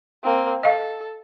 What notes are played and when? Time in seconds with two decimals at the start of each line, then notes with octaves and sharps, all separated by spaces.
0.24 A#3 C4
0.63 A4 D#5 F5